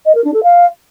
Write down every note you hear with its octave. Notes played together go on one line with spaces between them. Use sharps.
D#5
A#4
D4
A4
F5